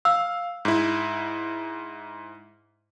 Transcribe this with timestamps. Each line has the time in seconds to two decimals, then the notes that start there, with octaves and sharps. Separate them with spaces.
0.05 F5 E6
0.65 G#2 E4